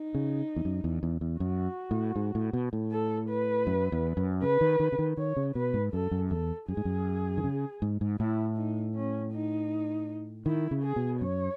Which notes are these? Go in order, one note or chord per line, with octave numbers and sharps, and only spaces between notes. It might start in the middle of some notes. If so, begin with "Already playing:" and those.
Already playing: D#4
C#3
E2
F#2
E2
E2
E2
F#2 F#4
A2
G#2
A2
B2
A2
A4
B4
F#2
E2
F#2
C#3 B4
D#3
D#3
C#3
D#3
D#3 C#5
C#3
B2 B4
G#2
F#2 A4
F#2
E2 A4
F#2 G#4
G#2
F#2
D#3
C#3
G#2
G#2
A2 E4
D#4
C#4
D#4
D#3 E4
C#3
G#4
B2
F#2 C#5